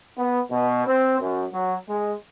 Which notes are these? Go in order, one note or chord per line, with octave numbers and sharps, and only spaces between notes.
B3
B2
C4
F#2
F#3
G#3